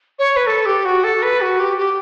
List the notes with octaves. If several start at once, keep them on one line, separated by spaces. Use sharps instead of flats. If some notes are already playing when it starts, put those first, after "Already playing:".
C#5
B4
A4
G4
F#4
A4
B4
F#4
G4
G4